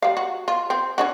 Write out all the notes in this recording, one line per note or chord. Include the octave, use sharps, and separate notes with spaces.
G3 F5
F#4
F4
C4
C#4 D4 F#4